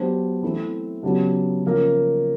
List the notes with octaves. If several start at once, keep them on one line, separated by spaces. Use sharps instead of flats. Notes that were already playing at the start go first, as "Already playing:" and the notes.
Already playing: F#3 B3 D4 G4 C5
E3 A3 C4 E4
C#3 F#3 B3 D4 G4
C#3 F3 A#3 C#4